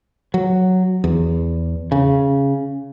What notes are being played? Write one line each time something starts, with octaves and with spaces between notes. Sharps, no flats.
F#3
E2
C#3